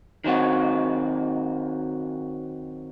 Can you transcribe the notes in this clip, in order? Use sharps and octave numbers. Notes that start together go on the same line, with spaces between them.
D#3 F#3 C4 F#4